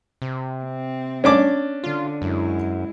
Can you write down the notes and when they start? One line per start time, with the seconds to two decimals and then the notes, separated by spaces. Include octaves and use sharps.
0.22 C3
0.64 C4
1.24 C#4 D4 D6
1.84 D3 F4
2.22 F#2 G#3 E4